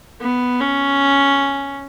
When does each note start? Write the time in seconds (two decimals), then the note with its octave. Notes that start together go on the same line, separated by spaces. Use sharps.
0.21 B3
0.61 C#4